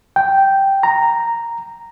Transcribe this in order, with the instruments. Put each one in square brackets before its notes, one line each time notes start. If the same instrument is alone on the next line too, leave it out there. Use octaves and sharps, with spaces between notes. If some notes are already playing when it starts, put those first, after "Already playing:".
[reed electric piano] G5
A#5